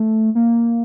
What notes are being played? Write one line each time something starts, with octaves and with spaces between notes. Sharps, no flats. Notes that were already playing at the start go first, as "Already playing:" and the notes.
Already playing: A3
A#3